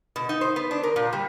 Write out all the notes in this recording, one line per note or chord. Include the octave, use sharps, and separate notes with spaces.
B2
D#4
C5
B3
D4
A#4
A#2
G3